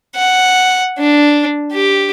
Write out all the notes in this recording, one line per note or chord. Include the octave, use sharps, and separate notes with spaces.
F#5
D4
G4